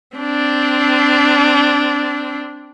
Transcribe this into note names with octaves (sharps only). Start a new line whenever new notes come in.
C4 D4